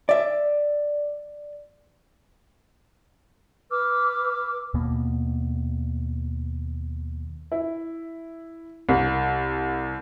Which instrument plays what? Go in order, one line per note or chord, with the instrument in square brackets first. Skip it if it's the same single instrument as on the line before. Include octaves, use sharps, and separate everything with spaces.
[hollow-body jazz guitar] D5 E5
[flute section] B4 D6 E6 F6
[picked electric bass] D#2 B2 A#3 B3
[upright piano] E4
C2